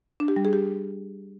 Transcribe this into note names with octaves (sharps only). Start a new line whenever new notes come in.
D4
G4
G3
G#4
G4